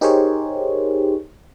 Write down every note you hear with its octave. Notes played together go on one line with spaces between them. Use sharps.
D#4 G4 G#4 A#4 C5 C#5